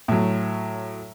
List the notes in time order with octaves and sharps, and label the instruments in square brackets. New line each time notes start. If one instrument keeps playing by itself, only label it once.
[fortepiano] A2 F#3